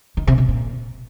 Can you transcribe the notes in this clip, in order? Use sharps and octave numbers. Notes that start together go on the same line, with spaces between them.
D#3
C3
C3
A#2